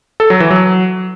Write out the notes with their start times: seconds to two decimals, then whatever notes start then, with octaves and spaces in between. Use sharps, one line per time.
0.20 A4
0.30 F#3
0.40 E3
0.51 F#3